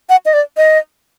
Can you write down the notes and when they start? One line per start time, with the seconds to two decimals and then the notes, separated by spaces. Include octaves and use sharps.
0.09 F#5
0.26 D#5
0.34 D5
0.57 D#5